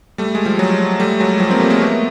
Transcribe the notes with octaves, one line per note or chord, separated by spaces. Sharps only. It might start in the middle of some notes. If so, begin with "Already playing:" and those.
G3 A3
G#3
F3 G3
F#3 G#3
G3 A3
F#3 G#3
F3 G3
A#3 C4
G3 A3
G#3 A#3
A3 B3